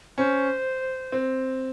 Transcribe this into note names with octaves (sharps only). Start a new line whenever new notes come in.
C#4 C5
C4